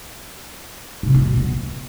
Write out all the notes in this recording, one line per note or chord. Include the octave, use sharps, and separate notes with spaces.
C3
F4
B2
B3